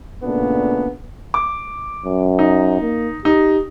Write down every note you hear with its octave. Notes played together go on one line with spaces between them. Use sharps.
A#2 C#3 A3 B3 D4
D6
F#2
D#4
A#3
D#4 G4